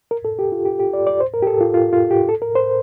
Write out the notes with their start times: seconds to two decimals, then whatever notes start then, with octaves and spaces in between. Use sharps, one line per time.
0.11 A#4
0.25 A4
0.39 G4
0.52 F4
0.65 G4
0.79 G4
0.93 D5
1.07 D5
1.20 C5
1.34 A#4
1.42 G4
1.47 A4
1.61 F4
1.74 F4
1.93 F4
2.11 G4
2.29 A4
2.42 A#4
2.55 C5